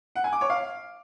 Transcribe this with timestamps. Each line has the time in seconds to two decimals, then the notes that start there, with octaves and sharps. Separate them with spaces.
0.15 F#5
0.24 G#5
0.33 D6
0.41 C#5
0.50 F5